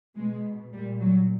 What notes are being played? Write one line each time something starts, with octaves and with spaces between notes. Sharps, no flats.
B2 G#3
A#2 G3
F#3